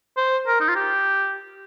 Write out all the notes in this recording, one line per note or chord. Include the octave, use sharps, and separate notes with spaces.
C5
A#4
D#4
F4
G4